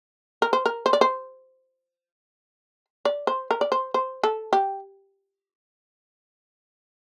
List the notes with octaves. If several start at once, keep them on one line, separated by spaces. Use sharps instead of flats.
A#4
C5
A#4
C5
D5
C5
D5
C5
A#4
D5
C5
C5
A4
G4